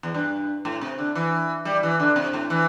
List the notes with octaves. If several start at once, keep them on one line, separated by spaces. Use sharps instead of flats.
E2
G2
A2
C3
D3
E3
G3
E3
D3
C3
A2
E3